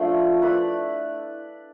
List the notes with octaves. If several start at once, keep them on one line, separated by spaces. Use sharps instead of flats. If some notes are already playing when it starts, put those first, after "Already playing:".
Already playing: F3 A3 D4 F4
E4 B4 D5